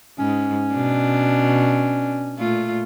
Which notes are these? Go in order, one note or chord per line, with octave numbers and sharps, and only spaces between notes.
G#2 C#4
B2 D4
A#2 A3 F4